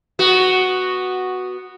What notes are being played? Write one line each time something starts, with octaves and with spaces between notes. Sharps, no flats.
B3 F#4